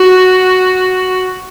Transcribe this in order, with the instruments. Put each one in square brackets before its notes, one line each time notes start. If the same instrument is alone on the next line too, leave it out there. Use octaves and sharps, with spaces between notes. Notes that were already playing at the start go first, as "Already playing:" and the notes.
Already playing: [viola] F#4